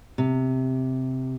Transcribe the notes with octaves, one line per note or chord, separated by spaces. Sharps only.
C3